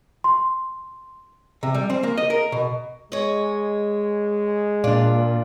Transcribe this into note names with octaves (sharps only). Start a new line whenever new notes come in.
C6
C3
G3
C4
A#3
D#5
A#4
B2
G#3 C#5 D#5
A#2 D4 F4 D5